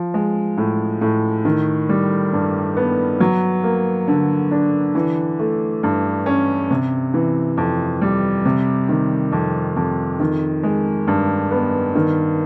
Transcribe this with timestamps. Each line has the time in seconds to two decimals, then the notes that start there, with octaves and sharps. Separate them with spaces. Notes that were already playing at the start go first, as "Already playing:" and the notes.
Already playing: F3
0.14 G#3
0.57 A2
1.01 A2
1.45 D#3
1.89 G3
2.33 G2
2.77 B3
3.20 F#3
3.63 A#3
4.08 D3
4.51 D4
4.95 E3
5.39 A3
5.83 G2
6.26 C#4
6.71 C3
7.14 E3
7.57 F2
8.01 G3
8.45 C3
8.89 D#3
9.32 F2
9.76 F2
10.20 D#3
10.63 G#3
11.07 G2
11.51 B3
11.95 D#3